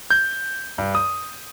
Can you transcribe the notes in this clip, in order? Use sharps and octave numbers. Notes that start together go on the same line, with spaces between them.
G6
G2
D#6